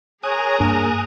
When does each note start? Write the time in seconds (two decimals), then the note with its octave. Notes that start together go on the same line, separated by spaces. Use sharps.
0.23 G#4 A#4 C#5 G#5 A#5 D#6 F#6
0.60 G2 A#3 D4